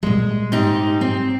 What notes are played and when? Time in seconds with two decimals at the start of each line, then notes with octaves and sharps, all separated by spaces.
0.03 A#2 G3 G#3
0.52 G#2 D#4 G4
1.01 C4